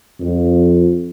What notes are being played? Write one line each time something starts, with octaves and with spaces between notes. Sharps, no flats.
F2